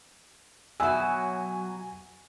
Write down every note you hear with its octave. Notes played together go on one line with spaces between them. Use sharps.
B2 F#3 F#4 E5 G#5 D#6 E6